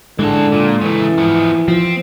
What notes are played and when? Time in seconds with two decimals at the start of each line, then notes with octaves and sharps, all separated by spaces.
0.19 D3 E3 G#3 A4
0.52 A#2
0.81 C#3 E3 A3
1.18 F3 B3
1.68 F3 C4